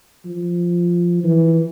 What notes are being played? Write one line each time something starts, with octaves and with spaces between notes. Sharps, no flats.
F3
E3